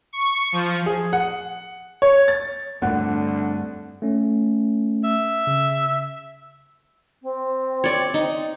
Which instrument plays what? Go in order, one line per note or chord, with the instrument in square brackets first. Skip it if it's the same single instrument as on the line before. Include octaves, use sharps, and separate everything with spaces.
[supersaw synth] C#6
F3
[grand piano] G#4
F#5
C#5
A6
[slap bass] G2 A3 C4 [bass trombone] D3 [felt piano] F#5
[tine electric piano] A3 C#4
[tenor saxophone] E5
[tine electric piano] C#3
[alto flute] C4
[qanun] C#5 D5
D#4